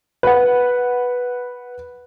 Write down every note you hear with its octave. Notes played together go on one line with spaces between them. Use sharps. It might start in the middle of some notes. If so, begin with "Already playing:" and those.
B4 F#5